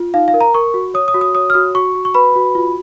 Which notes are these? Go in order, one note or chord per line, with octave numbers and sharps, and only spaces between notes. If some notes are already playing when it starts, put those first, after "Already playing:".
Already playing: F4
D#4 F5
F5
A#4
A#5
A#4 C#6
F#4
C#5 D#6
D#6
F#4
D#6
C#5 D#6
F6
F#4 D#6
F#4 C#6
F#4
C#6
B4 B5
F#4
F4